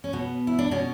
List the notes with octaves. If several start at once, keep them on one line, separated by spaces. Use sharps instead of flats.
C#4
B2 B3
E4
D4
B2 C#4